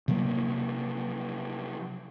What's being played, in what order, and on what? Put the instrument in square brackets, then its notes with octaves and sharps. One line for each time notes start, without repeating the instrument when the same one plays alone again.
[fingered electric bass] C3 F3 F#3 A#3